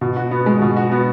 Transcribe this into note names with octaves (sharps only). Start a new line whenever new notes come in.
B2
F#4
B3
G#3
B2
F#4
B3